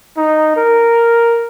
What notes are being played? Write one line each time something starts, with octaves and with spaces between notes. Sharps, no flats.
D#4
A#4